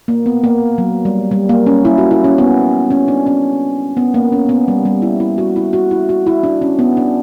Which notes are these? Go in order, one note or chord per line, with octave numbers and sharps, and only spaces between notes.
A#3
B3
A#3
F#3
G3
G3
A#3
C#4
E4
F#4
E4
C#4
B3
C#4
D4
C#4
B3
A#3
C#4
B3
G3
G3
E4
E4
F#4
E4
F#4
E4
F#4
E4
D4
C#4
B3
D4